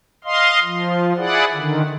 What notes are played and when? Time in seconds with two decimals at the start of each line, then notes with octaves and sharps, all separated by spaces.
0.24 D#5 F5 C6
0.62 F3
1.17 E4 G#4 D5 F#5
1.54 D3 D#3